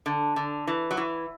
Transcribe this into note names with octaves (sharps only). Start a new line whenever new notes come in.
D3
D3
E3
F#3
E3